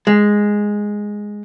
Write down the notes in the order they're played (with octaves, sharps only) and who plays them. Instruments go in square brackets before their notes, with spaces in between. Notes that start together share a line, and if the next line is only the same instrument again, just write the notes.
[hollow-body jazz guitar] G#3